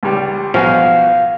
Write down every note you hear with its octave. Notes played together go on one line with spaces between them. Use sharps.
C#2 G3
B1 F3 F#4 F5 G#5